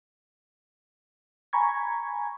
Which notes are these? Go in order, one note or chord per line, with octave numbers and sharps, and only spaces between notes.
G#5 A#5 B5 C#6 G#6